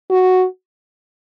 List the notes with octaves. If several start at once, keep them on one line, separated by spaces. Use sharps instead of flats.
F#4